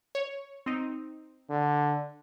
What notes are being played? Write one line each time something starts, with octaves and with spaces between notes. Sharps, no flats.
C#5
C4 D#4
D3